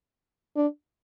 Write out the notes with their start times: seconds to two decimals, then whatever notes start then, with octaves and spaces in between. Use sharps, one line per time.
0.56 D4